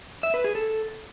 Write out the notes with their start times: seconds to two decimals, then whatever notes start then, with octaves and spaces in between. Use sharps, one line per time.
0.23 E5
0.34 B4
0.44 G#4
0.55 A4